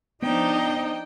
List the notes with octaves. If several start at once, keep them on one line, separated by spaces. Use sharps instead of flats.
F3 B3 D4 D#4 D#5 G5